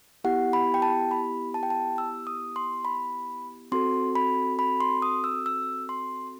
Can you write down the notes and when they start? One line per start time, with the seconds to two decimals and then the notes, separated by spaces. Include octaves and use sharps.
0.24 B3 E4 G4 F#5
0.53 B5
0.74 G5
0.82 A5
1.11 B5
1.54 A5
1.63 G5
1.70 A5
1.98 E6
2.27 D#6
2.56 C6
2.85 B5
3.72 C4 F#4 A4 C6
4.15 B5
4.59 B5
4.81 C6
5.02 D#6
5.24 E6
5.46 E6
5.89 C6